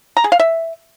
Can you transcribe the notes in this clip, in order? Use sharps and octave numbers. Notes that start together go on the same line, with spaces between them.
A#5
G#4
F5
E5